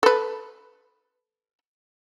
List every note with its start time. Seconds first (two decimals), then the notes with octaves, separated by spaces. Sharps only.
0.03 A4 B4